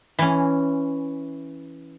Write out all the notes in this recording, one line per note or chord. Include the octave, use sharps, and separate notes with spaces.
E3 C#4